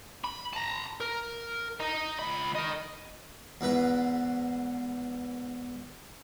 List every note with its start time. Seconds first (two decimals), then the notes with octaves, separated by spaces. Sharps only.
0.24 B5
0.53 A5 A#5
1.01 A#4
1.80 D#5 A#5
2.19 C#2 B5
2.55 A#4 D#5
3.61 E2 G#2 E4 B4